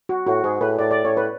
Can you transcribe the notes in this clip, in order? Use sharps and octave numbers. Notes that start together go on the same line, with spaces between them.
F#4
A2 F#4
G#2 G#4
A2 B4
A2 D5
D5
A2 C#5
B4